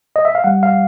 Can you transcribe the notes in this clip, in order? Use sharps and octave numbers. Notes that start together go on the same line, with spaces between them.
D#5
E5
F5
G3 F#5
F5